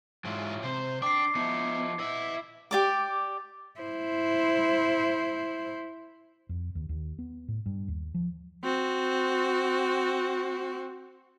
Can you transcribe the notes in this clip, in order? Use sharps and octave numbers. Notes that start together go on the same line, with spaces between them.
G#2 E3 F#3 F4
C3 C5
D4 G5 D6 C7
F3 B3 D#4 E4 C#7
E4 D#5 F#5
G4 D5 D6
E4 C5
F2
D#2
D#2
B3
A2
G2
D#2
F3
C4 F#4